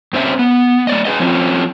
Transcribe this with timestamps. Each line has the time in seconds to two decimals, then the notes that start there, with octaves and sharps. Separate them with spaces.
0.13 G2 C4 C#4 E5
0.39 B3
0.87 A3 D5 D#5
1.05 G#4 B4 D#5
1.20 F3 C4 C#4 F4